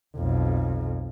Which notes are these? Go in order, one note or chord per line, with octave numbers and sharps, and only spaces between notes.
B1 F2